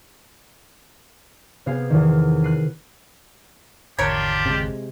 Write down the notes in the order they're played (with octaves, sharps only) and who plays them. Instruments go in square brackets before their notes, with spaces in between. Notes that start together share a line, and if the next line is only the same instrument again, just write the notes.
[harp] C3 B3 G#4 F5 C7
E2 D#3
F#6 C7 D#7
[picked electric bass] G#1 E2 D3 [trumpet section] D4 F4 G4 [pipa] A#4 C#5
[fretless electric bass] C3 G#3